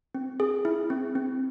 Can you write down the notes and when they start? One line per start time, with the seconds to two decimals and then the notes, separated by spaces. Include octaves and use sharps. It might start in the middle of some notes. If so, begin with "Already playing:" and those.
0.15 C4
0.40 G#4
0.65 E4
0.90 C4
1.15 C4